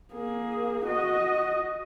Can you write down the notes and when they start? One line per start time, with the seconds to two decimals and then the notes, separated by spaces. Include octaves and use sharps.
0.14 A#3 G#4
0.86 F#4 D#5